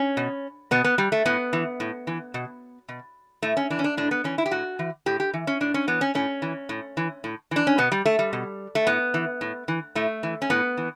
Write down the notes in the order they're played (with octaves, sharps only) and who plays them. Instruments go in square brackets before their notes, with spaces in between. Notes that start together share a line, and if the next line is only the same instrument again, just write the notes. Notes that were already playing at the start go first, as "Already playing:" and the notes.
Already playing: [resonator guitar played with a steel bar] C#4
B2
B2 B3
B3
G3
A3
A2 B3
E3
A2
E3
B2
B2
A2 A3
C#4
E3 D4
C#4
D4
A2 D4
B3
E3 C#4
E4
G4
A2 F#4
E3
A2 G4
G4
E3
C#4
A2 D4
C#4
E3 B3
C#4
A2 C#4
E3
A2
E3
A2
E3 D4
C#4
B2 B3
G3
A3
G3
B2
A3
A2 B3
E3
A2
E3
A2 A3
E3
C#4
A2 B3
E3